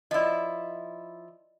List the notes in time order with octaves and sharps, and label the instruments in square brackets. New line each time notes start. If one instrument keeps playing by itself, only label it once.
[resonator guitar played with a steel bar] F3 E4 [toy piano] D5 D#5